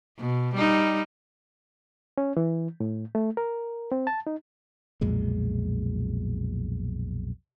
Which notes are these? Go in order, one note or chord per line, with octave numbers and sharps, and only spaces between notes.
B2
G3 D#4
C#4
E3
A2
A3
A#4
C4
A5
D#4
B1 F2 A#2 G#3